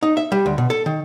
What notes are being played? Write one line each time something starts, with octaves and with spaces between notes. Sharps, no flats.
D#4
E5
G3
D2
B2
A4
D#3